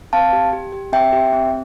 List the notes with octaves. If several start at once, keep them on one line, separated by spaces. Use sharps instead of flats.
C4 F5 A5
G4
G4
G4
C4 E5 G5
G4
C4